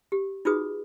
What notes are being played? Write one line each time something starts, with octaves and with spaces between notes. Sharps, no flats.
G4
D#4 F4 F#4 G#4 B4 D#6